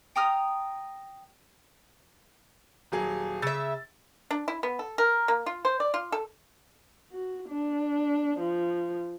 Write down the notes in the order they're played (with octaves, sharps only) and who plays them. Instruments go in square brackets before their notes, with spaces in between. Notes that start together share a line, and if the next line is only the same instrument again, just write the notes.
[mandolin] G5 A#5 D#6 F6
[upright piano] D#1 F#3 G#4
[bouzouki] C#3 E5 [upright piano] E6 A6
[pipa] D4
E4
B3
A4
A#4
A#3
F4
C5
D5
F4
A4
[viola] F#4
D4
F3